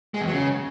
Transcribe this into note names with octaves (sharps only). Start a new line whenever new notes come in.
G#3
E2
F#3
C#3